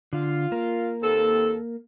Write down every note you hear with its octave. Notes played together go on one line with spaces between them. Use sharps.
D3 F4
A#3 A#4
D#2 C4 A4